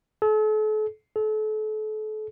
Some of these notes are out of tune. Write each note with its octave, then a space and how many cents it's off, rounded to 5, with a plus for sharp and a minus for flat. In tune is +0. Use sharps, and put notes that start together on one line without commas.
A4 -40
A4 -35